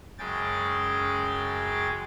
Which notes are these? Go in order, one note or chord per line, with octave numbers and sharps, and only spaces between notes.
F#2 C#3 G#3 G#4 G5 A6